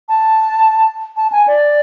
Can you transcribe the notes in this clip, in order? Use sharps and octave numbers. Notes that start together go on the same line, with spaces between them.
A5
A5
G#5
D5